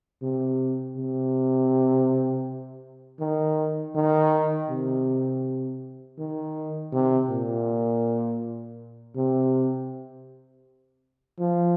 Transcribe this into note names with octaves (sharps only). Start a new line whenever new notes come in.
C3
C3
D#3
D#3
C3
D#3
C3
A#2
C3
F3